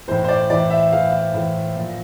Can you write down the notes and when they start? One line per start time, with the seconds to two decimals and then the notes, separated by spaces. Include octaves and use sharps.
0.08 E3 C5
0.11 A2
0.24 C5
0.29 D5
0.50 A2 E3 D5
0.70 E5
0.91 A2 E3 F5
1.12 F5
1.34 A2 E3
1.76 A#2 F3